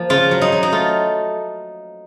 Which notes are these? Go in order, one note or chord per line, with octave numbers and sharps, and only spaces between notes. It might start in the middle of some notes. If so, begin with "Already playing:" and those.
Already playing: F3 A#3
C#3 F4
F#3
D#4
F#3
D#4
A3 F4